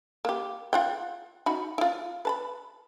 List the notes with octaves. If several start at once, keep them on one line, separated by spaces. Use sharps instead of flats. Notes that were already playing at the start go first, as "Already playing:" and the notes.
A#3 G4
F4 F#5 G5
D#4 F#4 B5
E4 F4
B4 A5 B5